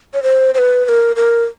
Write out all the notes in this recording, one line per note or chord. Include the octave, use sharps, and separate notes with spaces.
C#5
C5
C5
B4
B4
A#4
A#4